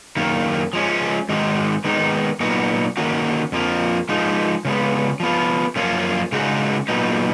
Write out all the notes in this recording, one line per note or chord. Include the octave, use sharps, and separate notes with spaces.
F#2 D#3 A#3
F3 G#3 C#4
G#2 D#3 G#3 D#4 F#4
D#3 G#3 B3 D#4
A#2 F#3 B3 D#4 F#4
D#3 A#3 C#4 F#4
F2 F3 A#3
F3 G#3 D#4
C#3 G#3 B3
F3 B3 F4
F#2 F3 A#3 C#4 F4
C#3 G#3 D#4 F#4
A#2 F#3 B3 D#4